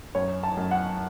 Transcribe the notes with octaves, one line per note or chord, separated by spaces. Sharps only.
F#2 C#5
A5
F#2
F#5